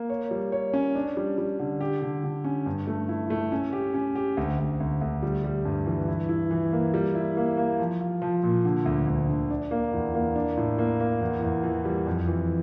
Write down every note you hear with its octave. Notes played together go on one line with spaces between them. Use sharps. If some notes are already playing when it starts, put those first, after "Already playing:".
Already playing: A#3
C#5
G3
C#5
C#4
D4
G3
G3
D3
G4
D3
D3
C#4
G2
A3
E4
A3
C#4
G4
C#4
G4
D2
D2
D2
D2
G3
G3
G2
E3
E4
E4
E3
A#3
G3
E4
A#3
A#3
F3
F4
F3
A#2
D3
D2
D2
D3
D4
A#3
E2
A#3
D4
A2
A#3
A#3
E2
E2
E3
G3
F2
E3